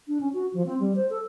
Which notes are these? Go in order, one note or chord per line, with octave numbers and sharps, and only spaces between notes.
D4
C#4
F#4
F3
C4
G3
C5
A4